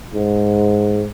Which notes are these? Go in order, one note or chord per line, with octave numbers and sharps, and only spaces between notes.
G#2